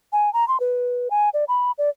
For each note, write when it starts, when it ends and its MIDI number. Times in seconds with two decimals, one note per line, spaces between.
0.13 0.32 80
0.33 0.47 82
0.48 0.60 84
0.60 1.08 71
1.11 1.29 80
1.34 1.44 74
1.48 1.71 83
1.78 1.89 74